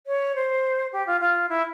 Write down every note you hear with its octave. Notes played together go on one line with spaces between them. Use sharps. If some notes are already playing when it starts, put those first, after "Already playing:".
C#5
C5
G4
F4
F4
E4